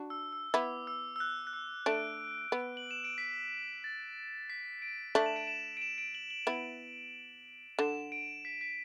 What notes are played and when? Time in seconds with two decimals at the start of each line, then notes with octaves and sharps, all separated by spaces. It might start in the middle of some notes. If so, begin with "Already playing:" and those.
Already playing: D4 F#4
0.10 E6
0.33 E6
0.54 B3 E4 D6
0.87 E6
1.16 E6
1.20 F#6
1.47 F#6
1.53 E6
1.86 A3 D4 D7
2.52 B3
2.77 F#7
2.91 E7
3.04 D7
3.18 B6
3.84 A6
4.50 B6
4.82 D7
5.15 A3 D4 F#7
5.26 E7
5.36 D7
5.47 E7
5.77 D7
5.82 E7
5.98 D7
6.15 F#7
6.30 F#7
6.47 B3 E4
7.79 D3 E7
8.12 D7
8.45 B6
8.61 B6